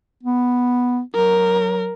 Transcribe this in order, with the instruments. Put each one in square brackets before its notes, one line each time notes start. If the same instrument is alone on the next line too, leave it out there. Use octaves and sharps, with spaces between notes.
[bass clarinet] B3
[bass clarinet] F#3 [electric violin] A#4